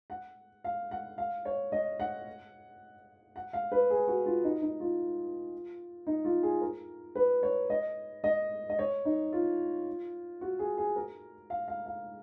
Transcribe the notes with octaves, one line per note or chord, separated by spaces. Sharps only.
F#5
F5
F#5
F5
C#5
D#5
F#5
F#5
F5
B4
G#4
F#4
F4
D#4
D#4
F4
D#4
F4
G#4
A#4
B4
C#5
D#5
D#5
D#5
C#5
D#4
F4
F#4
G#4
G#4
A#4
F5
F5
F5